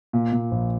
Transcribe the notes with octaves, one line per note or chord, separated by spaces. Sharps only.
A#2
A#2
A#1